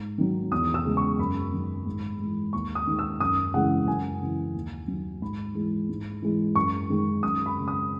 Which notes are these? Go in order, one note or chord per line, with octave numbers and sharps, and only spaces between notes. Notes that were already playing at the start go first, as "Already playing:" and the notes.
Already playing: G#2
D#3 F#3
E2 D#6
E6
C#3 G#3
C#6
F#2 B5
D#3 F#3
G#2
E3 G#3
D#2 C#6
D#6
D#3 G#3
E6
F#2 D#6
C#3 E3 G#3 F#5
F#2 G#5
C#3 E3
D#2
D#3 F#3
G#2 B5
E3 G#3
G#2
E3 G#3
F#2 C#6
D#3 G#3
F#2 D#6
B5
C#3 G#3
D#6